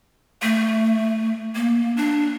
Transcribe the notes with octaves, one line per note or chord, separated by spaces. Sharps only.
A3
A#3
D4